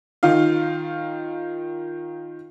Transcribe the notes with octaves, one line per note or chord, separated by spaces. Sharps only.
D#3 D#4 F4 F5